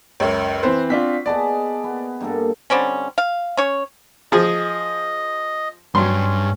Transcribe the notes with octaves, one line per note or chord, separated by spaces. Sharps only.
C#2 F#2 C#5
E3 C4 B4 C5
C4 D4 F4 F#4 B6
B3 G#4 D5 D#5 A5
B3
G2 A#3 A4
D3 G3 C4 C#4
F5
C#4 C#5
F3 G#4 D#5
G2 F#3 C#4 C6